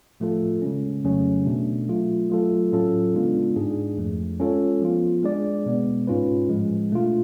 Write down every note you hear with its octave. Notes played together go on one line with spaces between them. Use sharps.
A2 F3 A3 F4 A4
C#3 G#3 C#4
F2 C#3 F#3 A3 C#4
B2 A3 D4
F#3 A3 F4
F#3 A3 F4 A4
A2 F#3 C#4 F4 A4
C#3 G#3 B3 D4 F4
G#2 G#3 D4 G#4
F2 F3 A3
G#3 C#4 F4 A4 C#5
F3 B3 F4
G#3 D4 G#4 D5
B2 G#3 B3
G#2 G#3 C#4 F4 B4
A2 F3 G#3
B2 A3 D4 F4